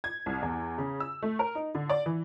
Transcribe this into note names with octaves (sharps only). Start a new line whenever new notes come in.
G#6
C2
E2
C#3
E6
A3
A#4
D#4
D3
D5
E3